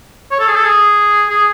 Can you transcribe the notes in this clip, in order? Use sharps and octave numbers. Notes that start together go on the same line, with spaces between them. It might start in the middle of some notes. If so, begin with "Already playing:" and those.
C#5
A4
G#4
A4
G#4
G#4